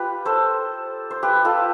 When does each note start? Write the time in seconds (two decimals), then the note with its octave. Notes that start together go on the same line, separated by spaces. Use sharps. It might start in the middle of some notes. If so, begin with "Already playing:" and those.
Already playing: F4 G4 B4
0.25 A4 C5
1.11 C5
1.23 G4 B4
1.45 F4 A4